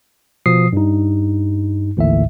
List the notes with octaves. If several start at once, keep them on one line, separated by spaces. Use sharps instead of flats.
B2 F3 D#6 C7
G2 D#4
A1 D#2 A2 D3 E5